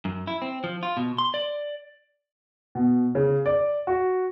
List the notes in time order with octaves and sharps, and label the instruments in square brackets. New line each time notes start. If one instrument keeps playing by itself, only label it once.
[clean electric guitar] F#2
E4
C4
F3
F4
B2
C6
D5
[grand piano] B2
C#3
D5
F#4